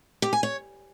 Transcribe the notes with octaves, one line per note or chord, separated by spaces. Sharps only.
G4
G#5
C#5